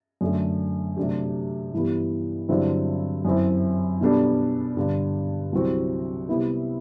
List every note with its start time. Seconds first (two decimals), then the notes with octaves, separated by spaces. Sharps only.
0.21 F#2 D3 A3
0.96 C3 F#3 A3 D4 G4
1.72 G2 E3 G3 B3
2.48 G2 D3 F#3 C4 E4
3.25 F#2 F#3 C4 E4
4.01 B2 G3 B3 D4 A4
4.77 G2 D3 G3
5.52 C2 C3 F#3 C4 F#4
6.29 C3 G3 B3 E4